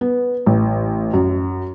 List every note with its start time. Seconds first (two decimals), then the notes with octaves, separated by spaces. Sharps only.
0.01 B3
0.46 A1
1.14 F#2